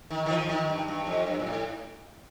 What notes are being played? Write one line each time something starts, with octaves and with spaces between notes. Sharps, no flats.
D#3
D#3
F3
D#3
G2
G2
F2
G2
A#2
A2